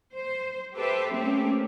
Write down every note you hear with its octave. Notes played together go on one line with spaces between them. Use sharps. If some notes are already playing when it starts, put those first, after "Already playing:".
C5
G4 A4 B4 C5 E5
A3 A#3 C4 C#4 G4